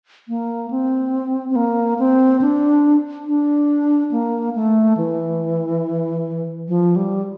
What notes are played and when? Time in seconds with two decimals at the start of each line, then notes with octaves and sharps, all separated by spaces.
0.28 A#3
0.70 C4
1.50 C4
1.56 A#3
1.99 C4
2.41 D4
3.27 D4
4.11 A#3
4.55 A3
4.97 E3
6.68 F3
6.96 G3